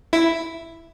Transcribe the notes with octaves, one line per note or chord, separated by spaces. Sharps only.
E4